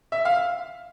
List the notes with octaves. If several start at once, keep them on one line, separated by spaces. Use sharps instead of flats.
E5
F5